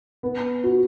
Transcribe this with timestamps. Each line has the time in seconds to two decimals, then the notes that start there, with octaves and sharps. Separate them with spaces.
0.23 B3
0.64 F#4